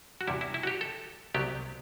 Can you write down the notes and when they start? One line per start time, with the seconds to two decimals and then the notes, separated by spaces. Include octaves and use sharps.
0.21 F#4
0.27 E2 C3 G3 E4
0.41 E4
0.54 E4
0.63 F#4
0.67 G4
0.81 A4
1.34 C2 C3 F#3 B3 G4